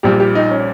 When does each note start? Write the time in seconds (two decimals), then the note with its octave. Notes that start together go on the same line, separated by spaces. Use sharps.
0.03 A#1 A#2 G3 G4
0.20 G4
0.35 D#4
0.51 C#4